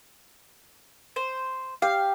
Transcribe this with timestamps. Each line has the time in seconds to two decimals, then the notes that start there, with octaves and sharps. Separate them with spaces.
1.16 C5
1.82 G4 F5